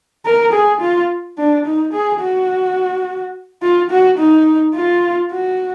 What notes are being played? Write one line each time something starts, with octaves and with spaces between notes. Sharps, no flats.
A#4
G#4
F4
D4
D#4
G#4
F#4
F4
F#4
D#4
F4
F#4